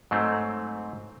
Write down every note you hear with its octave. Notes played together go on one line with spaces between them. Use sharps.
G#2 F#3 A3 C4